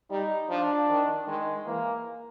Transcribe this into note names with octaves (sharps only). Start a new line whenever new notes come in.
G3 D#4
F3 D4
D#3
D#3 G#3
E3 A#3